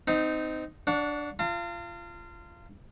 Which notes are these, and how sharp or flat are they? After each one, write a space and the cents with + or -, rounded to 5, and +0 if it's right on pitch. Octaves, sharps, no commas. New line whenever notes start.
C4 -25 D#4 +0
D4 +0 C#5 +40 F#5 -25
F4 -25 A5 +45